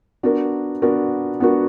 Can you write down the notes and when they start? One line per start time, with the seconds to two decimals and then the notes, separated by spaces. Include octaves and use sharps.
0.23 B3 D4 F#4 A#4
0.82 B3 D4 F#4 A#4
1.40 B3 D4 F#4 A#4